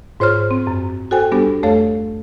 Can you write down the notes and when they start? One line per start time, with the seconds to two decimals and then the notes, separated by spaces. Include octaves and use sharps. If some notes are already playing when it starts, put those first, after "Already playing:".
0.20 G#2 F4 C5 C#5 C6 F6
0.51 C4
0.67 F#2
1.11 F#4 A4 C5 G5 G#5
1.32 G3 B3 D4 G4 A4
1.63 F2 A3 A4 C#5 F5